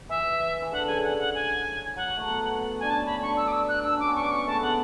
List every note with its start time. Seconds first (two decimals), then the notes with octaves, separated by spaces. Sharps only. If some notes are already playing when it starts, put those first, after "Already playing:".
0.09 E3 E5
0.62 E3
0.72 D3 F#5
0.87 C#3 G#5
1.02 F#5
1.19 F#5
1.35 G#5
1.96 F#3 F#5
2.07 F#3
2.17 A3
2.28 B3
2.80 D4 G#5
2.90 C#4 A5
3.06 B5
3.22 D4 C#6
3.37 E6
3.48 D6
3.52 E6
3.68 F#6
3.84 D4 E6
3.97 C#4 D6
4.08 B3
4.15 C#6
4.20 C#4 D6
4.31 C#6
4.47 A3 A5
4.55 B3
4.62 A3 F#5